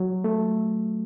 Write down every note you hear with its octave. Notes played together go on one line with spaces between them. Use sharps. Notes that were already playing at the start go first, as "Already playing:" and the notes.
Already playing: F#3
A3